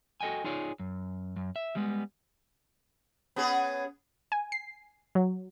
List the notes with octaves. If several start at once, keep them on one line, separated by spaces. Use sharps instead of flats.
F#4 A4 D#5 G5 G#5
D#4 F4 G#4 C#5 D5
F#2
F#2
E5
G3 G#3 B3
B3 C#4 G#4
G#5
C7
F#3